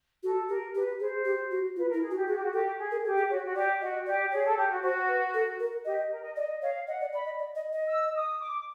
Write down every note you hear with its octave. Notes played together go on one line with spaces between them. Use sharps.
F#4 A4
G4 A#4
G4 B4
G#4 C5
G4
F#4
F4 B4
A#4
E4
G#4
F#4
G4
F#4 G#4
G4
F#4
G4 A4
G#4
A#4
G4 A4
G#4
F#4 C#5
F#4
G4 D5
F#4 D#5
G4 D5
G#4 C#5
A4
G4
F#4
F#4 C5
B4
A4
A#4
G4 D#5
A#4
D#5
D5 D#5
C#5 F5
D#5 F#5
D5
D5 B5
D#5
D5
D#5
D#5
E6
D#6
D6